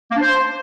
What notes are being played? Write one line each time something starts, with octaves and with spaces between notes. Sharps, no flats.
A#3
D4
C5